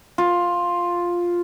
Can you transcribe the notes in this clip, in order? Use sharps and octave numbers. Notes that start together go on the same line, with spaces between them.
F4